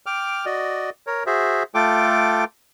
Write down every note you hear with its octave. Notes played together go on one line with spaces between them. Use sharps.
G5 D6 F6
F#4 D5 D#5
A#4 C#5
F#4 G#4 C5 E5
A3 F4 A4 G5 D6